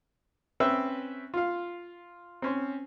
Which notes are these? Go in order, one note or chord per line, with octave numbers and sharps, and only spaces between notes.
C4 C#4 B4 E5 G5 E6
F4 F5
C4 C#4 C5